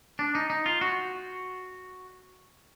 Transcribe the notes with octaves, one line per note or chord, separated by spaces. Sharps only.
D4
D#4
D#4
F4
F#4